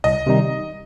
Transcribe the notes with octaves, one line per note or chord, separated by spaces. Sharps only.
C2 D#5
C3 D#3 G3 D#4